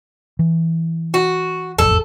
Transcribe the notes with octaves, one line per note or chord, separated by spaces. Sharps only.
E3
F#4
E1 A1 F2 A4